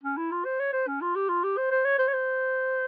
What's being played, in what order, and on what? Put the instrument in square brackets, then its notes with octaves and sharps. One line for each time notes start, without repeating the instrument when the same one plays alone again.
[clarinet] C#4
E4
F4
C5
C#5
C5
C#4
F4
G4
F4
G4
C5
C5
C#5
C5
C#5
C5